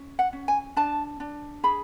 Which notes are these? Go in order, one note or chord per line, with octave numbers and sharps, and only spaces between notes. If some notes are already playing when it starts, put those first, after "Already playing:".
Already playing: C#4
F#5
C#4
G#5
D4 A5
D4
G#4 B5